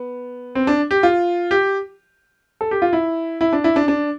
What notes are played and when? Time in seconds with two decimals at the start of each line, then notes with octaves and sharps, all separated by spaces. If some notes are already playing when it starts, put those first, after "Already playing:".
Already playing: B3
0.55 C4
0.67 D4
0.91 G4
1.03 F4
1.51 G4
2.61 A4
2.71 G4
2.82 F4
2.93 E4
3.41 E4
3.53 D4
3.64 E4
3.76 D4
3.88 D4